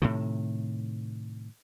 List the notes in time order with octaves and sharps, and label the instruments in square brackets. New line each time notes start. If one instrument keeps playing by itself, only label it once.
[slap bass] A2 C3 D#3